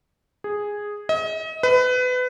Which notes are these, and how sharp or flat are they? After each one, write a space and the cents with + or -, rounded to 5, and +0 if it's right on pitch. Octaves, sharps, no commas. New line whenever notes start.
G#4 -5
D#5 +35
B4 +25